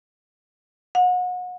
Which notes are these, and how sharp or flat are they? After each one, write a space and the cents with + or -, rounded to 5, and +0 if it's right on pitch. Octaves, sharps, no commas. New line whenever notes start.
F#5 -35